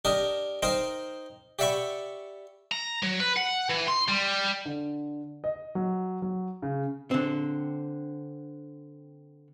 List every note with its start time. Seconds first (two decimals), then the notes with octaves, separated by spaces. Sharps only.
0.05 D4 G4 A#4 D#5
0.62 D#4 A#4 C5 G5
1.59 G4 D5 E5 F#5 B5 C#6
2.72 A#5
3.03 F#3
3.20 B4
3.37 F#5
3.70 E3
3.88 C6
4.09 G3
4.65 D3
5.44 D#5
5.75 F#3
6.22 F#3
6.62 C#3
7.11 D3 C4